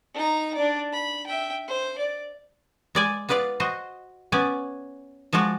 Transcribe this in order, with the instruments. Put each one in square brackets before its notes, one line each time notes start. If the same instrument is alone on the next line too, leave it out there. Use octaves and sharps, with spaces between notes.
[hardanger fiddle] D#4 A#5
D4 D5
B5
E5 G5
C5
D5
[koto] G#3 D5 G#5
B3 F4 B4 D5 F5
F#4 C5 D#5
B3 C#4 D5 G#5
F3 G#3 F4 F#4 D5